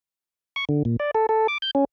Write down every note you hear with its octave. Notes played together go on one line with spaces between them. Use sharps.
C#6
D3
A#2
D5
A4
A4
D6
G6
C#4